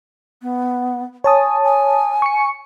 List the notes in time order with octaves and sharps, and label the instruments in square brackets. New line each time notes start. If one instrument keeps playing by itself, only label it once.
[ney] B3
[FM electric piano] C#5 A5 D#6 [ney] G#5
[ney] G#5
[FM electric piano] C#6 C#7